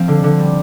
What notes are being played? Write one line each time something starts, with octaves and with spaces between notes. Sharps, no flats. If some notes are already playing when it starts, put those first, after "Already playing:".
Already playing: F3 C4 F5
D3
D3
G3